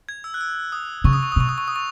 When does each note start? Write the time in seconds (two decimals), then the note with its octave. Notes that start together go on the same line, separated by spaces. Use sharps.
0.09 G#6
0.24 E6
0.34 F#6
0.41 E6
0.72 D#6
1.04 C#3 C#6
1.13 D#6
1.23 C#6
1.32 D#6
1.36 B2 C#6
1.49 D#6
1.58 C#6
1.68 D#6
1.76 C#6